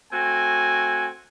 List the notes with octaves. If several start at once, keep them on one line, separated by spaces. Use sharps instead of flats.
A3 C4 F#4 G#5